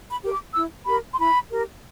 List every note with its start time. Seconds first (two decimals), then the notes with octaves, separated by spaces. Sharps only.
0.10 B5
0.21 G4 A#4
0.32 D6
0.53 E4 E6
0.85 G4 A#4 B5
1.13 C6
1.18 E4 B5
1.51 G4 A#4